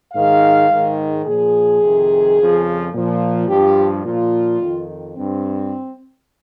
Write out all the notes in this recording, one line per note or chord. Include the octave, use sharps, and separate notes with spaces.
G#2 D#3 F5
G#2 D#3
A#2 F3 G#4
F2 C3 D#3
F2 C#3 F3
A#2 F3
G2 F3 G4
A#2 F3 F4
F2 D#3
G2 C4